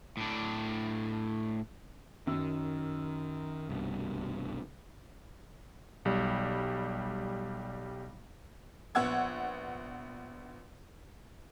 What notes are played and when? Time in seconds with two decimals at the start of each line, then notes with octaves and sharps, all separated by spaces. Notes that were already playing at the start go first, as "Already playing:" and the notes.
0.17 A2 D4
2.27 F#2 D#3 E6
3.69 C2 G2 B2
6.05 B1 G3
8.95 A#1 B3 F#5 E6 G#6